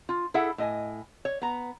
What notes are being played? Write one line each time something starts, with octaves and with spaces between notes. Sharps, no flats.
F4
E4 G#4 A4 E5 F#5
A2 D#5 G#5
C#5
B3 A#5